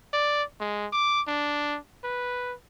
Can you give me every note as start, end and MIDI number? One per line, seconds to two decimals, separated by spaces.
0.13 0.43 74
0.60 0.87 56
0.93 1.21 86
1.28 1.78 62
2.04 2.54 71